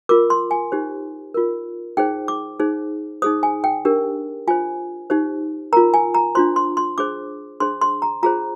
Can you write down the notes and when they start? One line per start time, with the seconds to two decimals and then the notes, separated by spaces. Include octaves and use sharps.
0.09 F4 A#4 D6
0.30 C6
0.51 G#5
0.72 D#4 G4 C5
1.34 F4 A#4
1.97 D#4 G#4 C5 G5
2.28 D6
2.60 D#4 G#4 C5
3.22 D#4 G#4 C5 D#6
3.43 G#5
3.64 G5
3.85 D4 G4 A#4
4.47 F4 C5 G#5
5.10 D#4 G4 C5
5.73 F4 A#4 A#5
5.94 G#5
6.15 A#5
6.35 D4 F4 C5 C6
6.56 C6
6.77 C6
6.98 D4 G#4 C5 D6
7.60 D4 G#4 C5 C6
7.81 C6
8.02 A#5
8.23 F4 G#4 C5 A#5